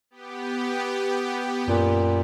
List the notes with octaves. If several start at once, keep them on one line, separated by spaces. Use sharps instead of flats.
B3 G4
F#2 A#2